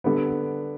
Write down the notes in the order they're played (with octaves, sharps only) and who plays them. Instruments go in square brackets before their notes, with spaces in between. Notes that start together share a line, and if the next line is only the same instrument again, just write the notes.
[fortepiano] D3 G3 B3